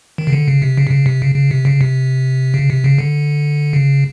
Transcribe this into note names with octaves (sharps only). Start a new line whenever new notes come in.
D#3
C#3
D3
C#3
C3
C#3
C3
C#3
C3
C#3
C#3
C3
C#3
C3
C#3
C3
C#3
D3
C#3